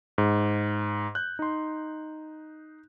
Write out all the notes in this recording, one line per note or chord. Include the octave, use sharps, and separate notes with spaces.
G#2
F#6 G6
D#4 C6